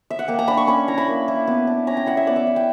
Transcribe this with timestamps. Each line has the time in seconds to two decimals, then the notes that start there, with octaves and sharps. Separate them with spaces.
0.10 E5
0.19 F#5
0.28 A#3 G5
0.39 A#5
0.48 D4 B5
0.57 C#6
0.67 C#4 B5
0.88 E4 A#5
0.98 B5
1.08 A#3
1.28 E4
1.47 B3
1.67 D4
1.87 C#4 A#5
1.97 G5
2.06 E4 F#5
2.17 E5
2.27 B3 D5
2.36 E5
2.47 E4
2.56 G5